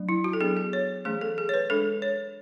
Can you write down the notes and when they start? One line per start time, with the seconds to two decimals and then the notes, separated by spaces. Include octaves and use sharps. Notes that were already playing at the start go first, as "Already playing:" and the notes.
Already playing: F#3 A3 D4
0.09 E4
0.24 F#4
0.33 A4
0.41 F#3 B3 D4 G#4
0.57 G#4
0.73 C#5
1.05 E3 A3 C#4 G#4
1.21 A4
1.38 G#4
1.49 C#5
1.54 B4
1.70 G#3 D4 A4
2.02 C#5